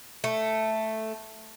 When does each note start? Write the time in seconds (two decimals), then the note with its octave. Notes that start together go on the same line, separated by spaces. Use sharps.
0.24 A3